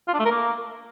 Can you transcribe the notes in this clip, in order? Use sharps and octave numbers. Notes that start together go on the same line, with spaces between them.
F4
D4
A3
A#4
A#3